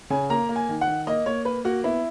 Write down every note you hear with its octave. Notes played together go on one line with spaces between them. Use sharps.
C#3 G#5
A#3 A#5
A#3
G#5
D#3
F#5
D#3
A#3 D#5
A#3 C#5
A#3 B4
A#3 F#4
B3 E4